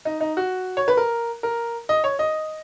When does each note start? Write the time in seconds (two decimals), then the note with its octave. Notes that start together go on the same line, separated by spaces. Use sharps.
0.05 D#4
0.21 D#4
0.37 F#4
0.77 C#5
0.88 B4
0.97 A#4
1.43 A#4
1.89 D#5
2.04 C#5
2.19 D#5